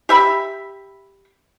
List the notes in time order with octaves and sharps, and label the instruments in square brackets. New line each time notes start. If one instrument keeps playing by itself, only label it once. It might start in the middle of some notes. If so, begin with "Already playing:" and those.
[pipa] G4 E5 B5